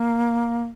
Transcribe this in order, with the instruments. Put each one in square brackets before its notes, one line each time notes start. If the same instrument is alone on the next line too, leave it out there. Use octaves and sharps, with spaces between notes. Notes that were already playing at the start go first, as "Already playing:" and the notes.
Already playing: [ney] A#3